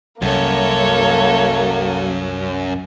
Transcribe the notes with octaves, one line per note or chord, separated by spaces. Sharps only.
C2 F#2 A#3 A4 C#5